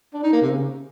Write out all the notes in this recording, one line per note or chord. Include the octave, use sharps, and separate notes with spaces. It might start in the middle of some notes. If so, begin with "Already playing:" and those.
D4
D#4
A#3
C3
C#3